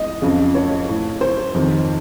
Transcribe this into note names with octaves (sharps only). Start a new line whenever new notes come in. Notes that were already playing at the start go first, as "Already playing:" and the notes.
Already playing: D#5
F2 C#3
C#5
A2
C5
F2 C3 D#3